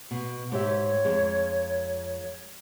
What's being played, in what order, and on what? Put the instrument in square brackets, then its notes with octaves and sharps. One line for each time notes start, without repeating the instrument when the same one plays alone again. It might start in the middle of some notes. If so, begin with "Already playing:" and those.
[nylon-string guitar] B2
[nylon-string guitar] G#2 G4 E5 [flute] C#5
[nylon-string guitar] F2 G#3